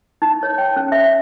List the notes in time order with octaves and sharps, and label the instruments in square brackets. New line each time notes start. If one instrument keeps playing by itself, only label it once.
[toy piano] D#4
C#5
G5
C#4
E5